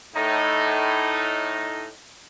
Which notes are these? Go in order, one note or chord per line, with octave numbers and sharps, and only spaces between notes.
A2 D#4